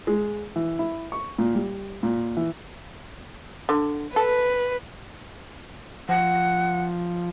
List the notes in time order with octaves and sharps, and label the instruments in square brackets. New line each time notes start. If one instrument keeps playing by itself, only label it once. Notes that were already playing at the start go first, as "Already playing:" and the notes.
[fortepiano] G#3
E3
E4
C#6
A#2
G3
A#2
E3
[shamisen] D3
[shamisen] A4 [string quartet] B4
[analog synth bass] F3 [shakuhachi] F#5